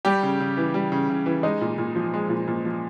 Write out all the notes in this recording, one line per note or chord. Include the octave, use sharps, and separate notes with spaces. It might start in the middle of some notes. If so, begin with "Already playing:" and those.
G3 G4
C#3
C#3
E3
G3
C#3
C#3
E3
G#3 D#4
A#2
A#2
F3
G#3
A#2
A#2
F3